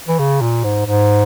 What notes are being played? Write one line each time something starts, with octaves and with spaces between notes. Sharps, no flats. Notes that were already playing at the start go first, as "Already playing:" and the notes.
E3
C#3
A#2
G#2
G#2